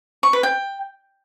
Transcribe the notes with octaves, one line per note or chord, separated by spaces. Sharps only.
C#6
B4
G5